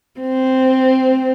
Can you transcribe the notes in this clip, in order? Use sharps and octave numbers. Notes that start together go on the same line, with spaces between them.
C4